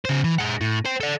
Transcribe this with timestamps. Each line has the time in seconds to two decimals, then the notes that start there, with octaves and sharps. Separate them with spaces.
0.05 C#3 C5
0.24 E3
0.38 G#3 F#5
0.61 A2
0.85 C5 G5
1.00 A4 D5